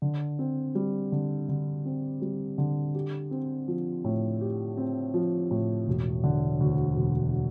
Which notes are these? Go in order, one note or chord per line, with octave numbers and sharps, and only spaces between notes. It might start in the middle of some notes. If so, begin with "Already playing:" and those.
D3
C4
G3
D3
D3
C4
G3
D3
G4
C4
F3
A2
G4
C4
F3
A2
E1
D3
D2
E1